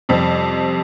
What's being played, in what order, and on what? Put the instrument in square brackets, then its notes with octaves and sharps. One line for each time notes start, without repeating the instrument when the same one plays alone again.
[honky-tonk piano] F2 C3 G3